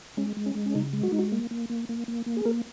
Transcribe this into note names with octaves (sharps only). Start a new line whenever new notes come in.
G#3 C#4
G#3
C#4
G#3
C#4
C#3 D#4
G#3
F#4
G#3 D#4
F#4
A#3
A#3
A#3
A#3
A#3
A#3
G#4
A#3 A#4